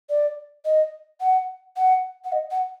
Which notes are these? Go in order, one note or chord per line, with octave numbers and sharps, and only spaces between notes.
D5
D#5
F#5
F#5
F#5
D#5
F#5